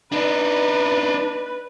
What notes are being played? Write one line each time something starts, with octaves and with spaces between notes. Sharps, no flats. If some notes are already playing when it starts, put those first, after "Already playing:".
D4 D#4 B4